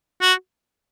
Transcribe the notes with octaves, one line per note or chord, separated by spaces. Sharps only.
F#4